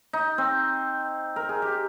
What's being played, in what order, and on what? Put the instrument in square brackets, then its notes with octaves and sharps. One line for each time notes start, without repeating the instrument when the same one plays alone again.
[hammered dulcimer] D#4
C4
A#4
G#4
G4